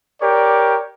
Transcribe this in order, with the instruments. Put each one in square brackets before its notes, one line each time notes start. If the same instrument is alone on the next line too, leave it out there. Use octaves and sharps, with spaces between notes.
[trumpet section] G4 A#4 C#5 D5